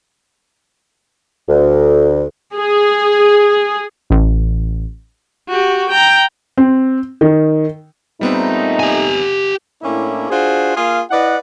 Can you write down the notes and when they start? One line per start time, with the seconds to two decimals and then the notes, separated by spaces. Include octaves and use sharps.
1.48 D2
2.57 G#4
4.10 A1
5.49 F#4 G4
5.90 G5 A#5
6.57 C4
7.21 D#3
8.21 A#2 G3 A3 B3 C4 D#4
8.80 G4 G#5
9.82 A2 A#3 C#4 D4 E4
10.30 D4 F4 F#4 G#4 C5
10.76 A#3 F4 G#4 F5
11.10 E4 B4 D5 D#5 F#5